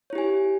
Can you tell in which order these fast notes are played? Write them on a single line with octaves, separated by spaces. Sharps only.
C#5 E4 G4 G#5